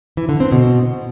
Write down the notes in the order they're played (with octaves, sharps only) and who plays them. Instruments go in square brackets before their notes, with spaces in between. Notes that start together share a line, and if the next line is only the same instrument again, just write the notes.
[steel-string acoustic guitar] E3
D3
C4
B2